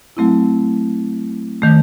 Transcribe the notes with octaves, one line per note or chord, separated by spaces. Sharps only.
F#3 A3 C4 E4
D#3 A3